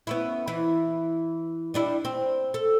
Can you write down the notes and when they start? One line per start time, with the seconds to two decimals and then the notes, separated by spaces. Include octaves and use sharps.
0.07 B3 C#4 E4
0.48 E3 E4
1.74 G3 D4 E4
2.05 C4
2.54 A4